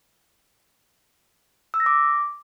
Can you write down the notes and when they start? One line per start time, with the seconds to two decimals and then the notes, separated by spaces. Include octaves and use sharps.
1.74 E6
1.80 A#6
1.86 D6